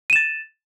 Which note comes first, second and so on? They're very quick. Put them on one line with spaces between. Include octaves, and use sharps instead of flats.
D#7 E7 A6